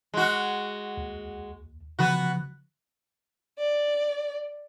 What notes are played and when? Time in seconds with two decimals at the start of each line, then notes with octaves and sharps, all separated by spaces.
0.14 G#3 F#4
0.97 D#2
1.99 C#3 F3 B3 F#4 F#6
3.59 D5